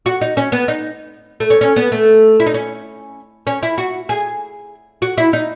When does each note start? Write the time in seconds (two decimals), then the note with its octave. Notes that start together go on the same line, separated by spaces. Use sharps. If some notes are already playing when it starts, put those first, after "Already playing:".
0.06 F#4
0.21 D#4
0.37 C#4
0.52 B3
0.68 D#4
1.40 A3
1.50 C#4
1.61 C#4
1.76 B3
1.92 A3
2.40 E4
2.46 D#4
2.54 C#4
3.47 C#4
3.63 E4
3.78 F#4
4.09 G#4
5.02 F#4
5.18 E4
5.33 D#4